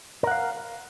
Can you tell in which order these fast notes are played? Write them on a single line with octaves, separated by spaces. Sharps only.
A#4 F#5 F5